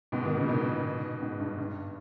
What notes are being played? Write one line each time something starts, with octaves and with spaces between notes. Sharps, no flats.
G#2 B2
B2 D#3
A#2 C#3
B2 D#3
G#2
G2
G2